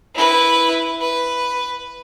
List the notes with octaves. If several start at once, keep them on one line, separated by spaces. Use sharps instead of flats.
E4 B4
B4